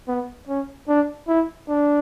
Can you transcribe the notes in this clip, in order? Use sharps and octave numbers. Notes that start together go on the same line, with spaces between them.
B3
C#4
D4
E4
D4